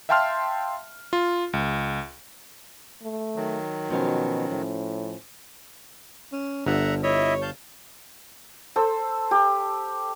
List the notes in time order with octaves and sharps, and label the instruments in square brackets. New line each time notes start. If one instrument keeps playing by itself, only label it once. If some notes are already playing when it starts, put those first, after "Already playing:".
[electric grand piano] E5 F5 G5 A5 C6 F6
F4
C#2
[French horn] A3
[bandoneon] D#3 F#3
[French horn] B2 [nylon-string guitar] F3 C#4 F5
[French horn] A2
[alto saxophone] C#4
[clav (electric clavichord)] G1 [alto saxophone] D3 [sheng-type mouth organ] E5 F#5 A#5
[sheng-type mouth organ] E4 D#5 E5 [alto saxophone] C#5
[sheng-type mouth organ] F5 A5 G6
[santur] A4 C5 E6
G4